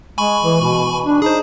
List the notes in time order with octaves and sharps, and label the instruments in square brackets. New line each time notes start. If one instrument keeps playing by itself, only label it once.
[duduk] G#3 [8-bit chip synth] G#5 B5 C#6
[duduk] E3
B2
D4
[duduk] D#4 [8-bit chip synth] G#4 C5